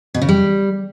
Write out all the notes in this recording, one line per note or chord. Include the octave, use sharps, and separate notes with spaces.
B2
C#3
G3